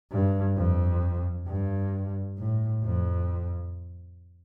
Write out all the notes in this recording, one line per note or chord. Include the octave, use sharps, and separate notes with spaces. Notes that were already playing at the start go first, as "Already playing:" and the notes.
G2
F2
G2
A2
F2